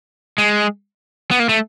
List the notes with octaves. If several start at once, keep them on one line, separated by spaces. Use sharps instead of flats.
G#3
B3
A#3
A3